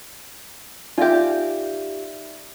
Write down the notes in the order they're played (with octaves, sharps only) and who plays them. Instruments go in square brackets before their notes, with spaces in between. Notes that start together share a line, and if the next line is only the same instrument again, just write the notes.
[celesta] D#4 D5 E5 [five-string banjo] F4 G4